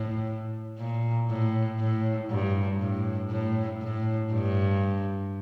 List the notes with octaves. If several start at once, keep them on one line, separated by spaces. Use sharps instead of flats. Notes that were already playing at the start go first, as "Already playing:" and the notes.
Already playing: A2
A#2
A2
A2
G2
A2
A2
A2
G2